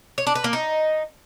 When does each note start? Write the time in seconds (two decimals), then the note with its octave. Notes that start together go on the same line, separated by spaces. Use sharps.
0.18 C#5
0.27 D4
0.35 B4
0.44 A#3
0.53 D#4